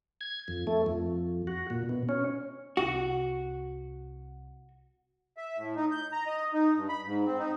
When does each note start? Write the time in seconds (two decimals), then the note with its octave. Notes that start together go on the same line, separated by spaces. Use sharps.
0.21 G#6
0.48 F2
0.67 A3
0.86 F2
1.47 F#4
1.70 A#2
1.89 B2
2.09 C#4
2.77 C2 F#4
5.37 E5
5.57 A2
5.76 D#4
5.91 G6
6.12 A#5
6.26 D#5
6.53 D#4
6.75 G2
6.89 B5
7.06 G#2
7.26 C4
7.39 D#4